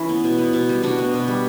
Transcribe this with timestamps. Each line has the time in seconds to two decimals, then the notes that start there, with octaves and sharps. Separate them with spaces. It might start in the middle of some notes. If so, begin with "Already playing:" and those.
Already playing: E3 C#4 E4
0.09 B3
0.24 B2
0.38 B3
0.53 B2
0.69 G3
0.83 B2 D4 F#4
0.98 B3
1.14 B2
1.28 G3